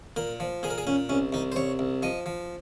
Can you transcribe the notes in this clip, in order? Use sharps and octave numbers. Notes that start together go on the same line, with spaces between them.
A#2 A#4
F3
A#2 G#4
A#4
G#4
A#2 C#4
C2 C#4
C2 D#4
C5
C2 C#5
C2
F3 D#5
F3